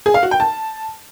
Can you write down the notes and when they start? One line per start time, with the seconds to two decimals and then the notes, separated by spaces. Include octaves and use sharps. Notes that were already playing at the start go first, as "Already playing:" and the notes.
0.06 G#4
0.14 F5
0.23 F#4
0.31 G5
0.40 A5